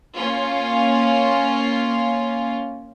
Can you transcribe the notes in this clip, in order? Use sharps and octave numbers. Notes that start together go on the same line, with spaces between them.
A#3 C#4 F4